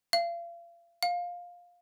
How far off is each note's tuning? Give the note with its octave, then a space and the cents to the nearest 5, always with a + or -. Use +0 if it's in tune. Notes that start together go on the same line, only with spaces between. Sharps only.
F5 -35
F5 +15